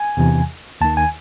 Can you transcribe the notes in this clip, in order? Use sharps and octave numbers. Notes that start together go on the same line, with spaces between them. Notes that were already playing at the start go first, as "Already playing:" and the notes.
Already playing: G#5
E2 C3 E3
D#2 D#3 A5
G#5